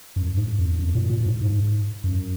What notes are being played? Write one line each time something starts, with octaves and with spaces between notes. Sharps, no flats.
F#2
G#2
F2
F#2
A#2
A#2
G#2
G#2
F#2